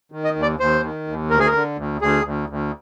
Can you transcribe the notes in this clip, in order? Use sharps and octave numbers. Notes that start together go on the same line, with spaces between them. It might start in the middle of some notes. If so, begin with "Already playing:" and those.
D#3
D#5
D#2
D5
D#2 C5
D#3
D#2
D2 A#4
G#4
A#4
D3
D2
D2 G#4
D2
D2